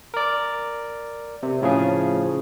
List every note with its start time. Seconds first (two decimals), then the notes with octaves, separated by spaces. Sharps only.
0.14 A#4 D5
1.43 C3
1.61 A2 C#3 F3 G#4